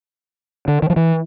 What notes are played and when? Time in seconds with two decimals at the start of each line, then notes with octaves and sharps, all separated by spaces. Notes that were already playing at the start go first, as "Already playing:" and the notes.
0.68 D3
0.82 D#3
0.90 F3
0.96 E3